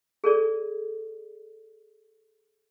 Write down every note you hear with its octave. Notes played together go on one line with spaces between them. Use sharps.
G#4 A4 D5